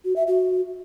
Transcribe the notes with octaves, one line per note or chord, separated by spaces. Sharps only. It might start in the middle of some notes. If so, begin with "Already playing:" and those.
F#4
E5
F#4